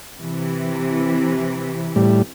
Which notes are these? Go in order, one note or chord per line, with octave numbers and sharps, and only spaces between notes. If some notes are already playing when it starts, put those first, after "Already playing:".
C3 E3
A2 G3